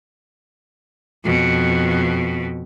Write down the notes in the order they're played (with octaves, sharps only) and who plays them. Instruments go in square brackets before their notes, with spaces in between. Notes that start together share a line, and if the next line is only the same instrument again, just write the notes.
[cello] F2 B2